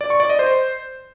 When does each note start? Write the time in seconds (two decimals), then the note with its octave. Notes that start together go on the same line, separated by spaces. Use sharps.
0.01 D5
0.10 C#6
0.20 D5
0.29 D#5
0.39 C5